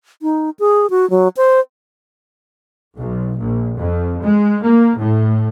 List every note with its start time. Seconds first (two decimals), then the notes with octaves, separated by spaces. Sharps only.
0.22 D#4
0.59 G#4
0.90 F#4
1.10 F#3
1.37 C5
2.99 B1
3.39 A#1
3.77 F2
4.22 G#3
4.63 A#3
4.98 A2